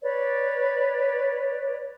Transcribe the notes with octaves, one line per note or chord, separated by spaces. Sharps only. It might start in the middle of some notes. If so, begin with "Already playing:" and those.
B4 C#5 D5